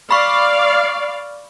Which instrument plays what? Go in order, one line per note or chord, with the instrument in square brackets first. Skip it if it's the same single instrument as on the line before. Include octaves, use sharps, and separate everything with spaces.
[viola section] D5 F5 [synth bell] B5 C#6